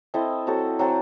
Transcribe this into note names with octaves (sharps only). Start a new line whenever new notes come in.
C4 E4 A4 D#5
F#3 C4 F#4 A4
F#3 C4 F#4 A4